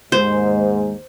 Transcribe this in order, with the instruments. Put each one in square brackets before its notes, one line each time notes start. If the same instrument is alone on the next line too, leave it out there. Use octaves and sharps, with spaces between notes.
[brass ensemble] D#2 G#2 [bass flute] G#3 [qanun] C5